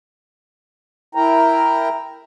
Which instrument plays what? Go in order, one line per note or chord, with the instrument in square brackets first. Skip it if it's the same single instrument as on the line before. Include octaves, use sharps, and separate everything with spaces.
[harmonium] E4 A#4 G5 A#5